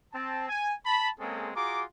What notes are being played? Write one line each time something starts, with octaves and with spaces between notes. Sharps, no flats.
C4 A5
G#5
A5 B5
G#3 A#3 C4 C#4 G#4 A4
F4 F#4 G#4 A#5 D6